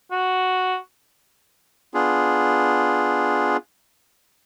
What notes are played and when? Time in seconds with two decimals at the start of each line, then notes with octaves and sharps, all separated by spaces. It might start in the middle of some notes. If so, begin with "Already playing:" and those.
0.11 F#4
1.94 B3 D4 F4 G#4